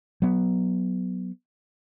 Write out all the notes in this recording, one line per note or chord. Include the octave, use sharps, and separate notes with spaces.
F#3 B3